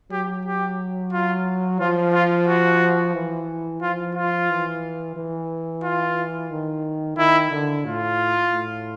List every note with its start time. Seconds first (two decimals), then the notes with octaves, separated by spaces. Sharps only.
0.11 F#3 G4
0.46 G4
1.13 F4
1.80 F3 F4
2.14 F4
2.47 F#4
3.15 E3
3.82 F3 F4
4.15 F4
4.49 E3
5.16 E3
5.83 F4
6.50 D#3
7.18 D#3 E4
7.51 D3
7.85 A2 F4
8.52 A2